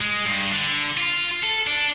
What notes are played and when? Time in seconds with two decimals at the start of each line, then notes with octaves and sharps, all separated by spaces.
0.01 G#3
0.26 G2
0.53 D3
0.97 F4
1.43 A4
1.67 D4